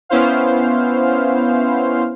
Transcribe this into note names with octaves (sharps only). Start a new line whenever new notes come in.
B3 C#4 E4 C5 F5